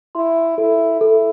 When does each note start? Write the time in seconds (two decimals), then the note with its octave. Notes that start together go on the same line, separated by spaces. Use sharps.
0.15 E4 C6
0.58 E4 A4
1.01 E4 A4